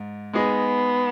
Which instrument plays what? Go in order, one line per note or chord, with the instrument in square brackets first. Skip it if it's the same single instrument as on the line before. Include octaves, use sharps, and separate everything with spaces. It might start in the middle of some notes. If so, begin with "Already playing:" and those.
Already playing: [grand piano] G#2
[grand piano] G#3 D#4 G#4 D#5 [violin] B3